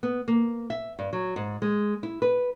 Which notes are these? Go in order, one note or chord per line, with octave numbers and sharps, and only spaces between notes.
B3
A#3
E5
G2
F#3
G#2
G#3
E4
B4